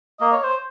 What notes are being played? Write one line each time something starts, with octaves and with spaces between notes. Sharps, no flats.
A#3 D#5
C#5
C5